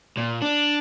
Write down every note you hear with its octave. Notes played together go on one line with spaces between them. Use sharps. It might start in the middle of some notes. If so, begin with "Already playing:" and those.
A#2
D4